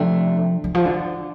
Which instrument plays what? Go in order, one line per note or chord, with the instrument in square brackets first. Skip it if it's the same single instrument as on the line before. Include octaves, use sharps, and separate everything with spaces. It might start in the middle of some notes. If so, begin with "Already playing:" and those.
Already playing: [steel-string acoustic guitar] C3 A3 D4 [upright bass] F3
[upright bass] D3
F3
D3